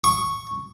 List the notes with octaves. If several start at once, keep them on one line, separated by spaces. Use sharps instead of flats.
C#6